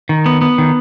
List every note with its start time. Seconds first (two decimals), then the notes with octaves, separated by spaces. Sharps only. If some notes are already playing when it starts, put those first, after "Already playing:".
0.09 D#3
0.26 B3
0.41 B3
0.58 D#3